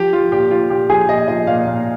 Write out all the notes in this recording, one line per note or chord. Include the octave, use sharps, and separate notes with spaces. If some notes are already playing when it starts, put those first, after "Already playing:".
Already playing: F3 G4
F3 F4
A#2 G4
F3 F4
A#2 G4
F3 G#4
A#2 D#5
F3 D#5
A#2 F5
A#2